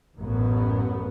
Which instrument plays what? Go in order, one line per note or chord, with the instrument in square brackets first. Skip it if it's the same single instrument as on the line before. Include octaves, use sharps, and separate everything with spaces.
[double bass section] A1 F#2 B3